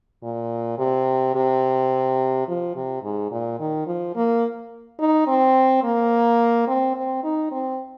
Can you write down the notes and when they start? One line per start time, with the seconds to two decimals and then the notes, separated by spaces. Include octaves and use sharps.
0.23 A#2
0.78 C3
1.35 C3
2.48 F3
2.75 C3
3.03 G#2
3.31 A#2
3.60 D#3
3.87 F3
4.15 A#3
4.99 D#4
5.27 C4
5.83 A#3
6.68 C4
6.95 C4
7.23 D#4
7.51 C4